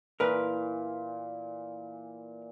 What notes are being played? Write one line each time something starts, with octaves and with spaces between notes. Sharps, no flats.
A#2 E3 A#4 B4